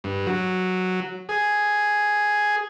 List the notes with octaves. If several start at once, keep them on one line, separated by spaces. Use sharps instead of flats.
G2
F#3
G#4